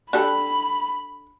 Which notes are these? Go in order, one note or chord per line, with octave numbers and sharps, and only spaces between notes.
D4 G4 A4 B5